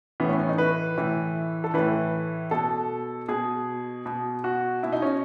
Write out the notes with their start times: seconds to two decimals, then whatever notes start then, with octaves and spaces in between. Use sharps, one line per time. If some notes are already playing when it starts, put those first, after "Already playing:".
0.20 A2 E3 B3
0.29 C#4
0.39 C#4
0.49 D#4
0.58 B4
0.97 A2 E3
1.64 A4
1.74 A2 E3 B4
2.51 B2 A4
3.28 B2 G#4
4.06 B2
4.44 F#4
4.83 B2 E4
4.93 D#4
5.02 C#4